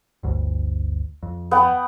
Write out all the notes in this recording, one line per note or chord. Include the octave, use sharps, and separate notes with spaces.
G1 D2
F2
B3 F#5 G5